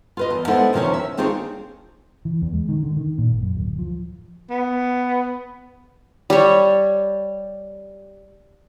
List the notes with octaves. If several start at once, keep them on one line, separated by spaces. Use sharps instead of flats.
F4 B4 D#5
E2
G#3 B3 D4 E4 A4 C5
E2 C3 D#3 F3 C#4 C#5
E5
D#3 C4 D4 F4 G#4 C#5
E3
E2
G#3
D#3
D3
D#3
A#2
G#1
F#2
D1
F3
B3
G3 C#5